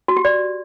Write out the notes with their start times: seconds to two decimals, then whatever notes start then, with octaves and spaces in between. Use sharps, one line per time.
0.08 F#4
0.17 G4
0.25 D5